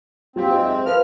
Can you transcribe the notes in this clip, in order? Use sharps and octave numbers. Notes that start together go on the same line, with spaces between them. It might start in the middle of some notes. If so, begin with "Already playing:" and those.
F#3 C4 F4 G4
G#2
E5
F3 F4 A#4 B4 F6